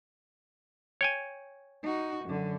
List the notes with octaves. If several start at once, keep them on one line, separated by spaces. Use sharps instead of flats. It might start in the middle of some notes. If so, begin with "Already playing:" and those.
C#5 G5 G#5
D#4 F#4
F#2 D3